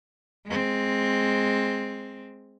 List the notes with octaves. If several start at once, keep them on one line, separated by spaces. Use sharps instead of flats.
G#3 C4